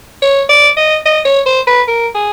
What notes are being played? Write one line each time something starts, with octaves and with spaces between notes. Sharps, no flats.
C#5
D5
D#5
D#5
C#5
C5
B4
A#4
G#4